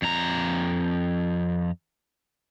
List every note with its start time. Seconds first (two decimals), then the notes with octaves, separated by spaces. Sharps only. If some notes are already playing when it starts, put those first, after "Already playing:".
0.02 F2 A#5